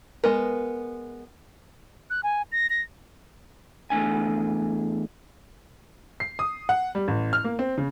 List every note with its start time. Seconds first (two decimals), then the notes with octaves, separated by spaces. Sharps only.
0.24 G#3 B3 A#4
2.10 F#6
2.23 G#5
2.52 A#6
2.70 A#6
3.90 E2 A3 D4 G#5
6.20 C7
6.39 D#6
6.69 F#5
6.95 G3
7.08 A1
7.33 F6
7.44 A#3
7.59 C4
7.78 C#3